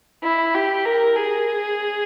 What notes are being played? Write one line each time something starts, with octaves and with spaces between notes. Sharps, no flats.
E4
G4
A#4
G#4